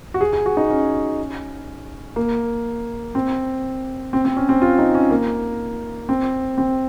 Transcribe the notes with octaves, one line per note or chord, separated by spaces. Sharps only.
F#4
G#4
G#4
F#4
D#4
C#4
A#3
C4
C4
C4
C#4
C4
F4
D#4
C#4
A#3
C4
C4